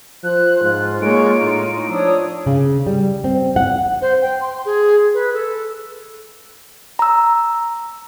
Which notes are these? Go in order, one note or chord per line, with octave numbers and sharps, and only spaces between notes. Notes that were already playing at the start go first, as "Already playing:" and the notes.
F3 C5 F#6
G#2 F4
G#3 A#3 C#5 D7
A2 D#4
F3 D4 C#5 D#6 E6
C#3
G3
C4
F#5
C5
G5
C6
G#4
B4
A4
A#5 E6